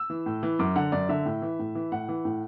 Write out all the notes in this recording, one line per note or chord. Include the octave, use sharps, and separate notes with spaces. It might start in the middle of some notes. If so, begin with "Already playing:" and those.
Already playing: E6
E3
A2
E3
F#2 D6
D3 F#5
F#2 D5
D3 E5
A2
E3
A2
E3
A2 F#5
E3
A2